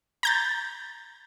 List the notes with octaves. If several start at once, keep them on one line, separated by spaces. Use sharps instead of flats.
A#5 G6 A6